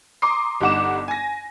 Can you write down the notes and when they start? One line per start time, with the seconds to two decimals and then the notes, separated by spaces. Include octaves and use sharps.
0.22 A#5 C6 D6 D#6 C7
0.61 G1 G3 D#4 F#5 D6 E7
1.08 G#5 A#6